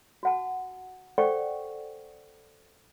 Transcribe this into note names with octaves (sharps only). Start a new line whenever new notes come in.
F#4 F#5 A5
A4 C5 D5 F#5 G5 C#6